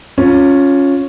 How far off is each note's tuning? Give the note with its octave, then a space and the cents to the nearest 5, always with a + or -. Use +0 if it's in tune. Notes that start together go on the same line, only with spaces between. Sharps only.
C#4 +0 F4 +15